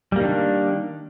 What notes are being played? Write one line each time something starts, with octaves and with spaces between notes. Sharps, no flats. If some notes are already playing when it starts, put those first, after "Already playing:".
D#3 G3 A#3 D4